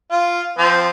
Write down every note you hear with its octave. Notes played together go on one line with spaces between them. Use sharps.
F4
F3 C4